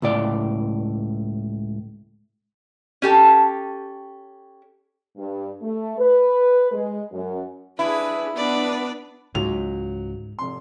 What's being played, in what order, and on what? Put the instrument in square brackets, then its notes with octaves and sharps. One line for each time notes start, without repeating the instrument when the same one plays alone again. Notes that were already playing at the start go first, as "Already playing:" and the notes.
[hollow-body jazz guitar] C#2 A2 D5
[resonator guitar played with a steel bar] C#4 G4 A4
[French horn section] G2
A3
B4
G#3
F#2
[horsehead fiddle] D4 G#4 [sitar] E4 [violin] B4
[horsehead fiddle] B3 D4 [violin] B4 D5
[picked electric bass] C#2 [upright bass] G#2 [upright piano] F#3 F7
[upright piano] F1 C6